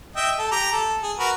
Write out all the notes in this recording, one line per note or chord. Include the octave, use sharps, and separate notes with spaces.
D#5 E5 G5
A4
G4 A#5
A4
G#4
F#4 A#4 B4